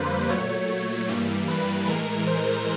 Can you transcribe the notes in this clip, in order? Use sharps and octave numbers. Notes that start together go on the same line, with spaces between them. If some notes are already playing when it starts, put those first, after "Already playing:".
Already playing: F2 D3 G3 A#3 B4 C5
A#2 F#3 A3 C#5
G2 E3 G3 A#3
B4
A2 E3 G#3 A#4
C5